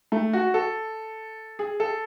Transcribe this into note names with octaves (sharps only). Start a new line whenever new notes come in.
A3
F#4
A4
G#4
A4